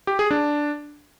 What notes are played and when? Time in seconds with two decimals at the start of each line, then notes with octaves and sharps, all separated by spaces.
0.07 G4
0.19 G#4
0.31 D4